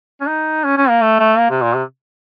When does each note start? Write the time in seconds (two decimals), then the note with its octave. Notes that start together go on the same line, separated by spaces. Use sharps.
0.21 C#4
0.28 D#4
0.64 C#4
0.77 C#4
0.89 A#3
1.02 A3
1.20 A3
1.38 A#3
1.50 C3
1.62 A#2
1.75 C3